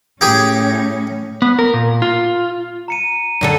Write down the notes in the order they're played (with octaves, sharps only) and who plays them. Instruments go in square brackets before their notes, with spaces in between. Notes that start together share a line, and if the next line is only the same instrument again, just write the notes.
[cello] A2 C#4 [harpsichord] G4 G#4
[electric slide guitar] B3
A#4
A#2
F4
[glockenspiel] A#5 C#7 D#7
[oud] F#2 D3 A4